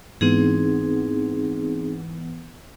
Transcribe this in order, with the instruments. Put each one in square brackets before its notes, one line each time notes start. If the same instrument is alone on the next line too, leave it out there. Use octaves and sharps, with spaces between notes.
[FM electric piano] G#2 E3 B3 [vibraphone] C4 D#4 G#4